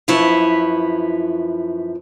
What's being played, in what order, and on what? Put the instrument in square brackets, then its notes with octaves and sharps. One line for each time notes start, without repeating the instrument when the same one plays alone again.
[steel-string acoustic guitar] F#2 F3 E4 B4 C#5